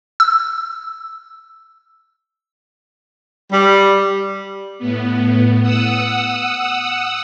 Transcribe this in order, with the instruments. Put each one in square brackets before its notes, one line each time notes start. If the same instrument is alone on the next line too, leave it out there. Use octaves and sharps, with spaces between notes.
[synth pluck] E6
[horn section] G3
[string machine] A2 B3
F#5 D#6 E6